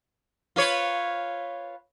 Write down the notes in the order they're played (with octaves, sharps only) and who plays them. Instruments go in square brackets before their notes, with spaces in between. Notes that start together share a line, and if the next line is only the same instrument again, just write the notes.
[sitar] F4 B4 C#5